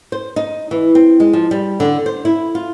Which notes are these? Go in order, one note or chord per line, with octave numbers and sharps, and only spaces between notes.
C5
D#4
E3
C4
G#3
F3
G3
D3
C5
E4
F4